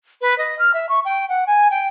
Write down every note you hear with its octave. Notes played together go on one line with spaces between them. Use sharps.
B4
D#5
F6
E5
C#6
G5
F#5
G#5
G5